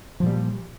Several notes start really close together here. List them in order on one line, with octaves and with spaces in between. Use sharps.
F3 A#2 G3